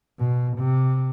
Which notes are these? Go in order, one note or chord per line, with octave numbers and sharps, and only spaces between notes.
B2
C3